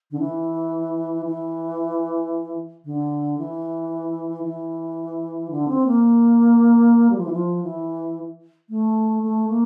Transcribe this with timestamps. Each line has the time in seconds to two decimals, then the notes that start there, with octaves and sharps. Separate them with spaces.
0.11 D3
0.19 E3
1.25 E3
2.85 D3
3.38 E3
4.44 E3
5.50 D3
5.68 C4
5.87 A#3
7.10 G3
7.18 F3
7.25 E3
7.33 F3
7.63 E3
8.69 A3
9.23 A3
9.49 A#3